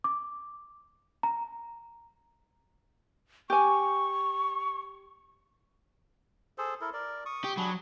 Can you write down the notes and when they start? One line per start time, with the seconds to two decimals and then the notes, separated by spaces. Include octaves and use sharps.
0.04 D6
1.23 A#5
3.50 G4 G#5 C#6
6.58 G#4 A4 C5
6.81 E4 A4 A#4
6.93 A#4 D5
7.26 C#6 D#6
7.44 G4
7.57 F#3 D4 G#4 B5